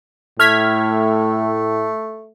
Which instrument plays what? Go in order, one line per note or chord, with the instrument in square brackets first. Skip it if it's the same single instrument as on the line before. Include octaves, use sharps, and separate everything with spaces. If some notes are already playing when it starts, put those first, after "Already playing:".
[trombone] A2 [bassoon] A3 [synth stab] F6 G#6 B6